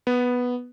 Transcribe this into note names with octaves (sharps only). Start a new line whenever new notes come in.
B3